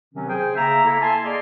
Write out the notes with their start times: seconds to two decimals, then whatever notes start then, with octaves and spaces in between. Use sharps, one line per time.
0.14 C3 D#3 F#3 C4 C#4
0.28 G#4 C5 G5 G#5
0.56 C#3 A#3 E5 A#5
0.84 A#3 E4 A4 E5
1.00 G#5 A5 C6
1.23 A#3 G#4 D5 D#5 A#5 C6